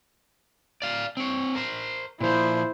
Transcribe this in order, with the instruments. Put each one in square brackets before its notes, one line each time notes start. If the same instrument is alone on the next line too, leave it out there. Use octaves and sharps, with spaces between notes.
[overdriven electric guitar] D5 F5
C4 C#5
A#4 C5
[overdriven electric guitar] A#2 F3 [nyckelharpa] E4 C5